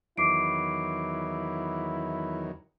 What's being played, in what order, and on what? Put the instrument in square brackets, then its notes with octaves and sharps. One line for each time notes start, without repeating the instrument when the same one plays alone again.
[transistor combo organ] E2 D#3 F#3 [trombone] E4 [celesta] D6 C7 D7